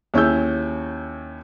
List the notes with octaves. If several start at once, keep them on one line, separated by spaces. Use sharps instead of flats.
D#2 C#4 E4 G#4 E6 G6